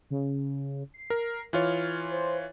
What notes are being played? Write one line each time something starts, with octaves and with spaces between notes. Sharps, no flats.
C#3
C7
A#4
E3 F4 C#5 F6
C5